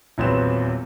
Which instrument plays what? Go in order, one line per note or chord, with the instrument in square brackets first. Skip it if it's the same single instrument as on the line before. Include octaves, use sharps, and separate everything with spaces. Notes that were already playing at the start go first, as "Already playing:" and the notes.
[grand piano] D#1 E2 F#3 C4 B4 E7